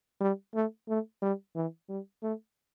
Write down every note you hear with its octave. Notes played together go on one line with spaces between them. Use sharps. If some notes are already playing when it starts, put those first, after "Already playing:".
G3
A3
A3
G3
E3
G3
A3